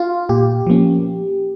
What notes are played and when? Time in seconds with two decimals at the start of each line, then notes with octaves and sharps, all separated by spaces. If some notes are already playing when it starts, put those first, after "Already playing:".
Already playing: F4
0.29 A#2 G4
0.67 F3 A#3 C#4